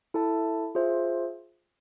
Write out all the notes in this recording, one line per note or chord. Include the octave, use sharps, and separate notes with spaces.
E4 A4 E5 A5
F4 G#4 C5 E5